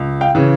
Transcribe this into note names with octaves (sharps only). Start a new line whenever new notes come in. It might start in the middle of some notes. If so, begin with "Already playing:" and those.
Already playing: C#2
F5 G5
C#3 E3